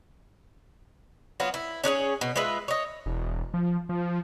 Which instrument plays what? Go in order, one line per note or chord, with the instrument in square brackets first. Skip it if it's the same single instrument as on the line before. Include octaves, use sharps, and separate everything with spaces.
[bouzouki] F#3 B3 F4
E4
C#4 D4 G#4 C#5
B2
G#3 F4 B4 E5
C#5 D#5
[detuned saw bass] E1
F3
F3